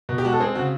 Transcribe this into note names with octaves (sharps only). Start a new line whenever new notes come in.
B2
G4
G#3 F#4
A4
C4 G#4
C#3 F#4